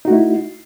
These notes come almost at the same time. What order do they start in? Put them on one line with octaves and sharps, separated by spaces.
D#4 F#4 A3 E4